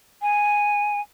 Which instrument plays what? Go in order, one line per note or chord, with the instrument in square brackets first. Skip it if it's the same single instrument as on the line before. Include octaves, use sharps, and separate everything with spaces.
[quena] G#5